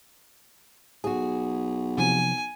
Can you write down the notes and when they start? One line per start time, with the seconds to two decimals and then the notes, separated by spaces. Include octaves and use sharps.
1.04 B1 F#4 G#4
1.98 C3 F3 G#5